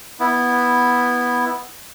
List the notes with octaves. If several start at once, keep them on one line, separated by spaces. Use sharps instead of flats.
B3 E4